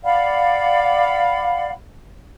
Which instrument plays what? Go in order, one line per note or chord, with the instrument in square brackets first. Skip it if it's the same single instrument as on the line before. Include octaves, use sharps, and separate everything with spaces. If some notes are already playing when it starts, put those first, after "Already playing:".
[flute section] D5 F5 F#5 B5